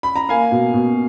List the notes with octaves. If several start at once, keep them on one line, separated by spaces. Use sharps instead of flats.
B5
A#5
A#3 F5 G#5
B2
B2